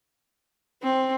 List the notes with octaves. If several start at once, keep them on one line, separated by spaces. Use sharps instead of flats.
C4